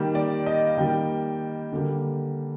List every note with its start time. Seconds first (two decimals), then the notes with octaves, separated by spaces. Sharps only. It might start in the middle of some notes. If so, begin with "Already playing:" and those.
Already playing: D#3 G3 A#3
0.15 D5
0.46 D#5
0.67 F5
0.78 D#3 G3 A#3 G5
1.72 D3 G3 A#3